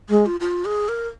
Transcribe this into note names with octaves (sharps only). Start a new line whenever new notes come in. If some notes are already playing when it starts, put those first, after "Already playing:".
G#3 G#4
F4
F4
G#4
A#4